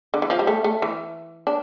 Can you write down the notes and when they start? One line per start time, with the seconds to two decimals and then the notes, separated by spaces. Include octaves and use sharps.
0.14 D3
0.22 E3
0.30 F3
0.39 G3
0.47 A3
0.64 A3
0.82 E3
1.47 D4